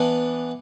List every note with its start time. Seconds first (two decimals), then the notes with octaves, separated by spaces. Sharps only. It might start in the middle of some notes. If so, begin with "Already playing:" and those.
Already playing: E3 B3 D4